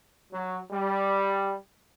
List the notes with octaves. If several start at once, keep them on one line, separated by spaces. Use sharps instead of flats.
F#3
G3